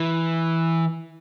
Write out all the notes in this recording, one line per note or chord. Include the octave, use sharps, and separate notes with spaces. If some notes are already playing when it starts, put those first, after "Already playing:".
Already playing: E3